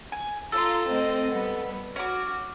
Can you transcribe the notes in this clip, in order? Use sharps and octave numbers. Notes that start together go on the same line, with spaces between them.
G#5
F4 A4 A#5
A3 C4 D#5
G3 B3
C#4 F#4 D6